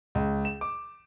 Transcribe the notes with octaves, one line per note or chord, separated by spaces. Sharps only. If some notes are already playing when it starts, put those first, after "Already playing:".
C#2
E7
D6